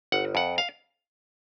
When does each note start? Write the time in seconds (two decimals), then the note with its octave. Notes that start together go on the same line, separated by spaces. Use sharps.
0.12 G1 F#5
0.35 F2 F#5
0.58 F5